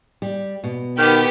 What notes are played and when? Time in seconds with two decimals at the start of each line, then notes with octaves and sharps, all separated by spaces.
0.22 G3
0.64 B2
0.98 D#3 B3 G4